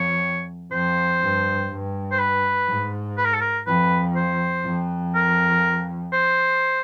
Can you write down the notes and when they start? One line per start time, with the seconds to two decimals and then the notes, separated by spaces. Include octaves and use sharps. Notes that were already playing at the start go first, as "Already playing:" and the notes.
Already playing: F2 C#5
0.72 F2 C5
1.21 G2
1.71 G2
2.12 C5
2.19 B4
2.68 G#2
3.18 B4
3.25 A#4
3.33 A4
3.41 A#4
3.67 F2 B4
4.16 C5
4.64 F2
5.15 A#4
6.13 C5